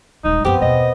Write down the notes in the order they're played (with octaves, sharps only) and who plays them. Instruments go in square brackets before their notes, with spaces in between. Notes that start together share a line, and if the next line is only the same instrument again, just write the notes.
[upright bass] D#1 G#3 [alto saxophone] D#4
[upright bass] F#2 F3 [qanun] B3 C4 [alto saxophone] G4
[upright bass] D#2 B2 [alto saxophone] D#5